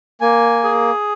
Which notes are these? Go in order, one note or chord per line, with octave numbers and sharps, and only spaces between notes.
A#3 G#5
G#4